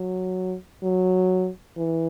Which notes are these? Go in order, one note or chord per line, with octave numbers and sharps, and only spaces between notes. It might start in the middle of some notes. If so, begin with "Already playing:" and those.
Already playing: F#3
F#3
E3